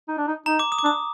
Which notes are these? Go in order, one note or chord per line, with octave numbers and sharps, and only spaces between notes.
D#4
D4
D#4
D#4 A#5
D6
D#6
D6
D4 D#6